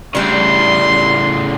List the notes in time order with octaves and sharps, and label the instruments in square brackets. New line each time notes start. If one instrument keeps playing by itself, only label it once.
[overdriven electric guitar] A2 C#3 [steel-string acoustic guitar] G3 D4 [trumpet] C6